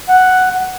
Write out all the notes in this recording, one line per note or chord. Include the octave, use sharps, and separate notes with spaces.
F#5